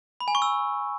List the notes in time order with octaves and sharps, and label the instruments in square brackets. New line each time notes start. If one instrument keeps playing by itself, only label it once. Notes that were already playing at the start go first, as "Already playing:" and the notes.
[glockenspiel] B5
G#5
C#6
E6